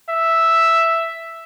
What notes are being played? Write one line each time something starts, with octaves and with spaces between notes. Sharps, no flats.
E5